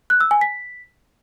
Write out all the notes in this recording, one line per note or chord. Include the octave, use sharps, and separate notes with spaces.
F#6
E6
G#5
B6